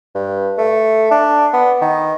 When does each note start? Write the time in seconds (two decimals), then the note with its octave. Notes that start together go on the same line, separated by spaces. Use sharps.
0.15 G2
0.58 A3
1.11 D4
1.54 B3
1.82 D#3